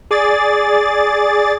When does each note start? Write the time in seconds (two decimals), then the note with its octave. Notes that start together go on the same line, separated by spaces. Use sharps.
0.11 G#4 D5 A6